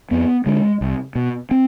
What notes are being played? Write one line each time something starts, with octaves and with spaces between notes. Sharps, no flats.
F2 B3
D3 G#3
C2
B2
C4